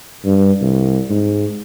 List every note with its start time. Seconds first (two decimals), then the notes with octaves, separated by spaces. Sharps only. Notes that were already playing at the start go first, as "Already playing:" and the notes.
0.25 G2
0.61 C2
1.10 G#2